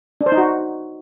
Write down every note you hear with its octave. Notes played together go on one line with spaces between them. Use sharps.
D4
C5
D#4
F#4